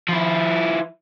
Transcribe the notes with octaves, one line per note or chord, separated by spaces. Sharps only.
F3 E4